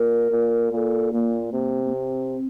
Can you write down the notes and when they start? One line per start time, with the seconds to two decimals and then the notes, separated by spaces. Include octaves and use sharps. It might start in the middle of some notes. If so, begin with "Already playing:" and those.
Already playing: A#2 A#4
0.31 A#2
0.72 A#2 A#4
0.77 A4
1.13 A#2 A#3
1.53 C3
1.85 A#3
1.94 C4